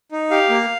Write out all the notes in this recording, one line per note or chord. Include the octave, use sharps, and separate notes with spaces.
D#4
G4 F5
A#3